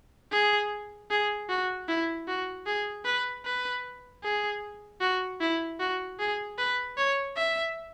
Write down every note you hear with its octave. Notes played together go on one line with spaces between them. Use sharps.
G#4
G#4
F#4
E4
F#4
G#4
B4
B4
G#4
F#4
E4
F#4
G#4
B4
C#5
E5